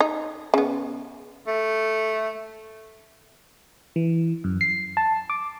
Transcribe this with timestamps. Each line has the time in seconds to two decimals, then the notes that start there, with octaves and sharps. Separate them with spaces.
0.01 D#4
0.54 C#3 B3
1.47 A3
3.96 E3
4.44 F#2
4.61 C7
4.97 A5
5.30 D6